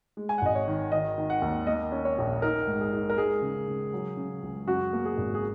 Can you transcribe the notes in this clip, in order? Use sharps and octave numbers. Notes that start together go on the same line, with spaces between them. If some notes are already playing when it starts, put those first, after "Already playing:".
G#3
G#5
F#5
G#1 D#5
C#5
D#3
D#3 D#5
D#3
F#5
D#2
A#3 D#5
C#4
C#5
A#1
D#4 A#4
G#2
G#4
D#4
A#4
G#3 G#4
C#3
C#3
F#3
C#3
C#2
F#2 F#4
A#3
G#4
G#1
G#4